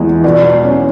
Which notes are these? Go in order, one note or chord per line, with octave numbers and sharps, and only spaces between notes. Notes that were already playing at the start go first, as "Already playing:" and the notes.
Already playing: E2 E3 G#3
B2 D5
C#4